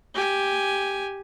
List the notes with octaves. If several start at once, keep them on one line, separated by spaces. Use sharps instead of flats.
G4 G#5